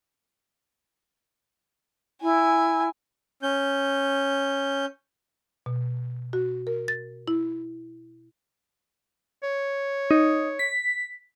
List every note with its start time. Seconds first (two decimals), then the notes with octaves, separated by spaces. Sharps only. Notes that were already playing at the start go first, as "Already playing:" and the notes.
2.22 E4 G#5
3.43 C#4 G6
5.66 B2
6.33 F#4
6.67 A#4
6.88 A6
7.28 E4
9.43 C#5
10.11 D#4
10.59 B6